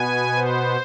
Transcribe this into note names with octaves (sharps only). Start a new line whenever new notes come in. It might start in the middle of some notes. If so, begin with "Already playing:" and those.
Already playing: B2 B3 G#5
C5